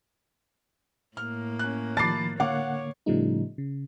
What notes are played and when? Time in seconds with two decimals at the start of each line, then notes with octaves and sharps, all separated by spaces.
1.17 A2 A#3 F6
1.59 C#4 F#6
1.97 D#3 F3 A5 B5 D6 A6 C7
2.40 D3 A#3 C#5 F5 F#5 D6
3.06 A2 C#3 F3 G3 A3 D#4
3.58 C#3